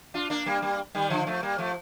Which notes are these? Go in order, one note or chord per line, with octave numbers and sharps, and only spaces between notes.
D4 F4
A#3 D4
G3 A#3
G3 A#3
D#3 G3
D3 F3
F3 A3
G3 A#3
F3 A3